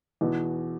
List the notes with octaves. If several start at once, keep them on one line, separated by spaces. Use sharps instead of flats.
E2 B2 B3